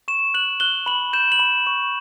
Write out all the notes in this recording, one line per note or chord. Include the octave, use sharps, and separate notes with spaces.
C#6 E7
F#6 F#7
F#6 G7
B5 F#7
G6 E7
F#7
B5 E7
C#6